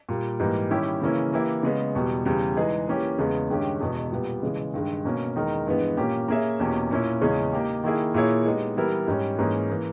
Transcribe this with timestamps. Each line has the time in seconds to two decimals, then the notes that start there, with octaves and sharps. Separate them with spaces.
0.09 A#2 G3 A#3
0.40 G#2 E3 G3 A#3
0.71 D#3 G3 C#4 E4 G4
1.02 C#3 E3 A#3 C#4 E4
1.33 E3 A#3 E4 G4
1.63 C#3 G#3 B3
1.95 E2 B2 G3
2.25 E2 C#3 G3
2.57 E3 G#3 D#4 G#4
2.88 E3 A#3 C#4 G4
3.18 E2 C#3 G#3 B3
3.50 G2 D#3 G#3 C#4 G4
3.80 E2 B2 G#3 B3
4.12 A#2 G3 B3
4.43 C#3 E3 G#3
4.74 G2 D#3 G#3
5.05 B2 A#3 C#4
5.36 E2 D#3 G#3 D#4 A#4
5.67 G2 E3 G#3 B3
5.97 A#2 A#3 C#4 G4
6.28 A#3 C#4 G#4 C#5 E5
6.60 E2 B2 A#3 C#4 G4
6.91 A#2 A#3 C#4 E4
7.21 E2 C#3 G#3 C#4 G#4
7.53 A#3 D#4 G4
7.84 D#3 A#3 E4 G#4
8.14 A#2 A#3 E4 G#4 C#5
8.46 G#3 B3 D#4 G4
8.76 E3 G3 B3 E4 A#4
9.08 G#2 G3 C#4
9.39 G#2 E3 A#3 C#4 G#4
9.69 E3 A#3